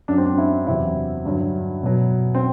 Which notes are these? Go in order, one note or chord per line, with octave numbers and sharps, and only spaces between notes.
F#2 F#3 D4
C4
D4
E4
E2 C3 F#3 E4
G2 D3 F#3
B2 F#3
C4